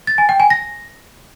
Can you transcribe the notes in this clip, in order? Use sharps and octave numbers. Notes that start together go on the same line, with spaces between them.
A6
G#5
G5
G#5
A#6